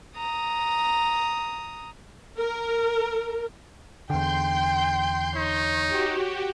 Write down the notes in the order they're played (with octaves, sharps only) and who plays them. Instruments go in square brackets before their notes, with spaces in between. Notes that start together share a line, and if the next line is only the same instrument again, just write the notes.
[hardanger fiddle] A#5 D#6
[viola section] A#4
[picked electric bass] E2 D3 [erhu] G5 [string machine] C6 G6
[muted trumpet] D#4 [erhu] C#5
[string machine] F#4 G4